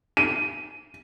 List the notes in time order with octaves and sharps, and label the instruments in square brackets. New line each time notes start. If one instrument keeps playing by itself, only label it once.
[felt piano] D#7